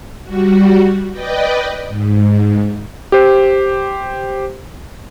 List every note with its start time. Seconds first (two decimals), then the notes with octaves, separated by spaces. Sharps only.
0.24 G3 F#4
1.11 B4 D5 D#5 G5
1.88 G#2
3.12 G4 C5